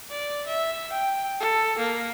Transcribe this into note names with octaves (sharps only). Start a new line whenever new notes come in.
D5
E5
G5
A4
A#3